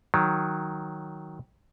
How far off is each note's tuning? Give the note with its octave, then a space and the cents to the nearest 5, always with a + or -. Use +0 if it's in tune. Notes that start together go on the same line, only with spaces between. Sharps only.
D#3 +0 F#3 +0